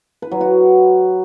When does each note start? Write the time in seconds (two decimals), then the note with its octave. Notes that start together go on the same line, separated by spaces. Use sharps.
0.22 B4
0.32 F#3
0.41 F#4